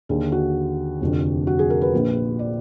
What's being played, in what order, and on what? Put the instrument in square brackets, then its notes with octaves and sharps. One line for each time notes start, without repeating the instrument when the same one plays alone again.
[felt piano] D#2 D3 G#4
F#4
F1 F2 D3
F#4
G#4
A#4
B4
A#1 A#2
D5